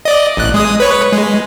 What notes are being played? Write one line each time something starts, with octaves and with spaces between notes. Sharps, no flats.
D5 D#5
A1 F#6
G#3 D#6
B4 C#5
G#3